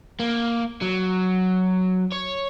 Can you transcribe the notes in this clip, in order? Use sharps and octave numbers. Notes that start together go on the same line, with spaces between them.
A#3
F#3
C#5